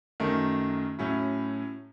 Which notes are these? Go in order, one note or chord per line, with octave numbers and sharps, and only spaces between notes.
F#2 D#3 A3
A2 F#3 C#4 E4